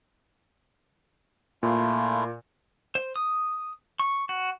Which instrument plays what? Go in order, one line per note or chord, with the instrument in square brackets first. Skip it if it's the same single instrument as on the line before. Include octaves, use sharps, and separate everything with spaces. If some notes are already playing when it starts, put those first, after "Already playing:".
[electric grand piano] A#2 [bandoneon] A3 E4 F4
[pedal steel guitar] C5
D#6
C#6
F#4